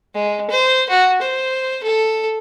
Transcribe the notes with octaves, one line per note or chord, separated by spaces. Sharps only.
G#3
C5
F#4
C5
A4